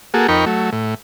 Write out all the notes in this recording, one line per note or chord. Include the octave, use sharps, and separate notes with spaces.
A#3 F#4 G#4 A4
F2 D#4 A#4 G5 B5 C#6
F#3 A3
A2